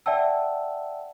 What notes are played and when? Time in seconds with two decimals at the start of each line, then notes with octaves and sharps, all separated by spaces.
0.06 D5 E5 F#5 G5 A5 E6